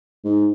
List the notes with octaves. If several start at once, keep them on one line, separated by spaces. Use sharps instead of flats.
G#2